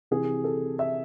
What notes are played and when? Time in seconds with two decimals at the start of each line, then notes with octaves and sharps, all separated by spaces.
0.11 C3 E3 G#4
0.44 A4
0.79 E5